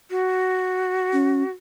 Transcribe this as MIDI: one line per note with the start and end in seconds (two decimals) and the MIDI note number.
0.11 1.51 66
1.13 1.43 61